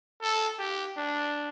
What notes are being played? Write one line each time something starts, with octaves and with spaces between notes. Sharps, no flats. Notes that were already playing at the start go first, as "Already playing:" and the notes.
A4
G4
D4